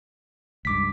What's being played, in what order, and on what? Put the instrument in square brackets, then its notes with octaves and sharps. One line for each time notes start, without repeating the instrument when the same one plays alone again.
[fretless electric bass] C#2 G2 [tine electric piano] D6 B6